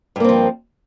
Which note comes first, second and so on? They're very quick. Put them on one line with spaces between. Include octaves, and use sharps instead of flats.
G2 A#3 C4 F3